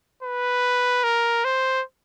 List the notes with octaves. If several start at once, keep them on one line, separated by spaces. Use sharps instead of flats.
B4
A#4
C5